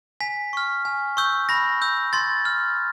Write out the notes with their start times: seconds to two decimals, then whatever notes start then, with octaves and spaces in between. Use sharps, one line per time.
0.21 G#5 B6
0.53 C#6 F6
0.85 G#5
1.17 C#6 E6 G6
1.49 B5 A#6
1.81 E6 G6
2.13 C6 A6
2.45 F6